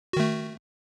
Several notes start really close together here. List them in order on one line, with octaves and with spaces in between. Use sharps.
F#4 D#3 A3